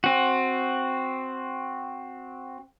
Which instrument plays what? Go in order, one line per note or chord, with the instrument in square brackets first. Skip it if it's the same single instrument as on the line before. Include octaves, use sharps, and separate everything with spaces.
[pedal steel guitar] C4 F#4